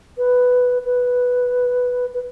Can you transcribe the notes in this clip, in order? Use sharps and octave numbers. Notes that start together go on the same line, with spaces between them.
B4
B4
B4